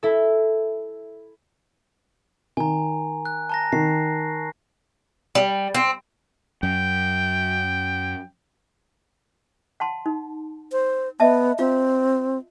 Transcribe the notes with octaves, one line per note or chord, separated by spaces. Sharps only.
E4 A4
D#3 G#5 A#5
F#6
A5 A#5 A#6
D#3 C7
G3
C4
F#2 G5
F#5 A5 C6
D#4
C5
B3 D#5 E5 A5
C4 F4 F5